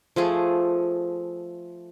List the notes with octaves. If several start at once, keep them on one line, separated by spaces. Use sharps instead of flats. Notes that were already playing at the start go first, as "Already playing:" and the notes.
F3 A3 G#4